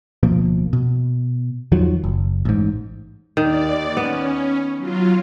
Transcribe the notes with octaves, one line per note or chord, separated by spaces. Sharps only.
D1 B2 F3 A#3
B2
E2 D#3 F3 F#3
F#1
A1 G#2
D#2 D#3 D5
B3 C#4
F#3 F4